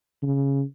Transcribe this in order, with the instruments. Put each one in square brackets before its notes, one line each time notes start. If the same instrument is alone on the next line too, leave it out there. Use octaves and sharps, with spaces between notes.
[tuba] C#3